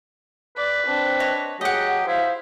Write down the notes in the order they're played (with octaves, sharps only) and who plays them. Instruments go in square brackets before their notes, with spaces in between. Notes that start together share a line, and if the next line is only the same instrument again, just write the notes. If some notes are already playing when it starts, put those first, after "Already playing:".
[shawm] B4 [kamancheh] D5
[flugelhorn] C4 [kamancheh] D4
[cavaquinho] C#5 D#5
[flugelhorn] F#3 [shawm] G4 [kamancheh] G#4 [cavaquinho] D#5 F#5
[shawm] E4 [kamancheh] C5 [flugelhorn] F5